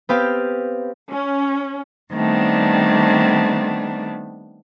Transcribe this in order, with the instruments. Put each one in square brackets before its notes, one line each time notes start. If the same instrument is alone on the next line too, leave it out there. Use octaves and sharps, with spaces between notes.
[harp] B3 C4 G4 F5
[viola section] C#4
[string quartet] D#3 G3 A3 B3 C4 D4